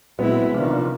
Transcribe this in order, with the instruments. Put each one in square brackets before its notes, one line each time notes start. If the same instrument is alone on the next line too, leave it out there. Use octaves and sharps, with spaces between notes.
[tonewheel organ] A#2 F#3 C4 [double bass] G#3 E4 [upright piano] B3
[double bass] C3 D#3 [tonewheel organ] F3 D4 F4